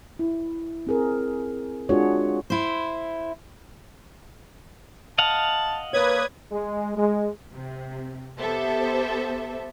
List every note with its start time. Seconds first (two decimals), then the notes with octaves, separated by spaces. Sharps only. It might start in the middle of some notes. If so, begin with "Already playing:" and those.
0.19 E4
0.87 C4 G#4 A#4
1.89 G#3 D4 F4 F#4 G#4 C#5
2.50 E4 C5
5.18 D#5 F5 F#5 A5
5.93 A#3 B4 C#5 D5 D#6 G#6
6.52 G#3
6.96 G#3
7.52 C3
8.39 B3 G4 A4 C5 E5